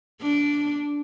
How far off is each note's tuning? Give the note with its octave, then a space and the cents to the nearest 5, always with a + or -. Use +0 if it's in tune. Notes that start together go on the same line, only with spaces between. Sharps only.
D4 -10